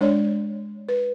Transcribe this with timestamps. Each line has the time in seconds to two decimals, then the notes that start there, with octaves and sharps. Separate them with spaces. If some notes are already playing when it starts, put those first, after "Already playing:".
0.01 G#3 D4 C#5 D5
0.89 B4